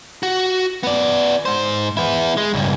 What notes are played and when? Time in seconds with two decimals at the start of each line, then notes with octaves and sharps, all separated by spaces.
0.23 F#4
0.83 B3 D5
1.45 G#2 C5
1.97 B3 E4
2.37 G#3
2.54 C#2 G2